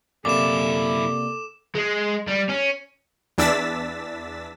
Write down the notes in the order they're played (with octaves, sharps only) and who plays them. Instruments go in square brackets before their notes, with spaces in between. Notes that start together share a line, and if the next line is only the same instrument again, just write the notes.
[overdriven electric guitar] F#2 E4 [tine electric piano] C3 A#3 D5 [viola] A4 [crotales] D6 E7
[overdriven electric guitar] G#3
G3
C#4
[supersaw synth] E2 D4 E6 A6 B6